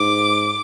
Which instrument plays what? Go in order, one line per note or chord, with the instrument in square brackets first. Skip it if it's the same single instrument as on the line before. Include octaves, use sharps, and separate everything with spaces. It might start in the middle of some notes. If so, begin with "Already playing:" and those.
Already playing: [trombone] G#2 [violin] D6